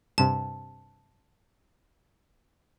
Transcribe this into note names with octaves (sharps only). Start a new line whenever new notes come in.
G2 C3 A5